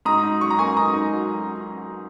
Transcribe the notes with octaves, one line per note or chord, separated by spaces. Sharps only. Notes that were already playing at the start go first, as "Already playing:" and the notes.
G#2 A#5 D#6
D#4
F#3 C#6
A#5
A#3 G#5 C#6
G#2 A#5 D#6
D#4
F#3